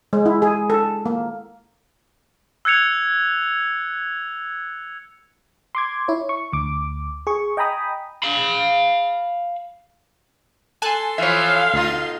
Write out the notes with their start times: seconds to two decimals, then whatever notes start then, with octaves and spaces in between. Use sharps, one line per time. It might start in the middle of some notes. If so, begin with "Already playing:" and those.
0.13 G#3
0.26 E4
0.42 G#4
0.70 A4
1.06 A#3
2.65 E6 F#6 G#6 C#7 F7
5.75 C6 D6 G#6
6.08 E4 C#5
6.29 C#6
6.53 D2 D6
7.27 G#4 C#6
7.57 D#5 G5 G#5 A#5 B5 D#6
8.23 F5 B5
10.82 A4 G#5 A5 C6 F#6
11.18 E3 F3 C#5 E5 F5
11.74 D2 B2 D#4 F4